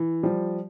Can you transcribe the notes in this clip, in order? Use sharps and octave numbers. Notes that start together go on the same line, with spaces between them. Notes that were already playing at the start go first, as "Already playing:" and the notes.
Already playing: E3
F3 G3